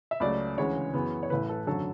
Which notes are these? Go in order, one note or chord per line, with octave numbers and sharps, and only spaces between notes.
E5
C#2 C#3 F#3 A3 D5
D2 C#3 E3 G#3 C#5
F#2 C#3 E3 B3
C#5
A1 A2 E3 A3 B4
A4
G#1 F#2 D3 F#3 A4